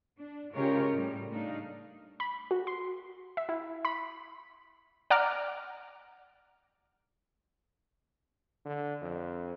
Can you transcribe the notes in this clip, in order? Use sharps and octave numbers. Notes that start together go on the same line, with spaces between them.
D4
C#3 G#3 F4 G4 A#4 C#5
A2 G3
A3 D4 D#4 F5
B5
F#4
C6
E5
E4
B5
D5 F#5 A#5 D6 F6
D3
F2